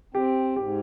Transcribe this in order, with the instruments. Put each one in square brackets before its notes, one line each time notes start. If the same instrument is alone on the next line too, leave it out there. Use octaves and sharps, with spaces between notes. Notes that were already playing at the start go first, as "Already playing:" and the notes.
[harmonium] C4 [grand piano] G4
[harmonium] G#2 [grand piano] G4